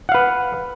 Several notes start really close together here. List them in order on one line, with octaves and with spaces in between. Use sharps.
F#5 F5 B4